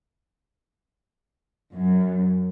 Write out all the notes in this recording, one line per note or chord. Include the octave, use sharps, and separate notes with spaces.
F#2